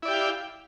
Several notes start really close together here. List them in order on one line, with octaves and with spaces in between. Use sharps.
E4 D5 G4 G5 F5